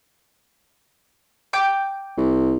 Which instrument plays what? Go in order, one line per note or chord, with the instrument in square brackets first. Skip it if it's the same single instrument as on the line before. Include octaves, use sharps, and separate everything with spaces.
[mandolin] G5 D6 G6
[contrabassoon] C2